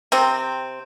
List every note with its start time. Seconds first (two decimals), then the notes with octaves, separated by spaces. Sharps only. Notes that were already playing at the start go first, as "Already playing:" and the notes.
0.12 C3 C4